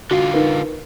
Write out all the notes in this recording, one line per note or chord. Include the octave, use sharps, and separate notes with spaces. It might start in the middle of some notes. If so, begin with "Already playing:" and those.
D3 F4 F#4
D#4 A#4 B4